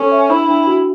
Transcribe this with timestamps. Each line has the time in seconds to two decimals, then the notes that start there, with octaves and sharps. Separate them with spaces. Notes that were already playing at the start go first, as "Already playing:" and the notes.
Already playing: C#4 A4 G#5
0.12 E5
0.30 D4 E4
0.48 D4
0.67 F#4